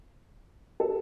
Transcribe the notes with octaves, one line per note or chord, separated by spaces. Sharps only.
A4